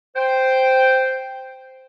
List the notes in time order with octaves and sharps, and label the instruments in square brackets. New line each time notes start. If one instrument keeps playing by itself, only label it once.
[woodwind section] C5 G5